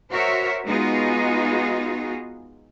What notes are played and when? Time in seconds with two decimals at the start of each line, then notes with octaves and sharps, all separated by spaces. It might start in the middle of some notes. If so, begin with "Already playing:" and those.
0.11 F#4 A#4 C5 C#5 E5
0.67 G#3 B3 D#4 F4 F#4 G#4